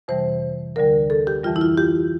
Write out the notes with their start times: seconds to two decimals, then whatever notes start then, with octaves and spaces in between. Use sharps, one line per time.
0.08 F2 C3 E3 G3 C5
0.76 D2 D3 G3 A#4
1.10 A4
1.27 G4
1.44 F2 E3 G3 F4
1.56 E4
1.61 F4
1.78 G4